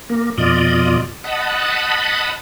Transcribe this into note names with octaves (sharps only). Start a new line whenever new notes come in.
A#3
F2 B2 F4 D5 D#5
D#5 F#5 A5 B5